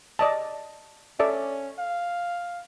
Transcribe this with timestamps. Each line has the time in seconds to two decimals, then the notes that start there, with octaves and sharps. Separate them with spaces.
0.19 D5 D#5 A5
1.19 C#4 A4 D5 E5
1.79 F5